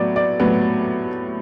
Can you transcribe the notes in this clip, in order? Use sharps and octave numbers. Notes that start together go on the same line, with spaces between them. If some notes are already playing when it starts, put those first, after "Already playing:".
Already playing: A2 F#3 B3 D5
D5
A2 F#3 B3